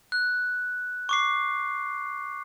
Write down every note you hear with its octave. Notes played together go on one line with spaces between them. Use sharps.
F#6
C#6 D6 C7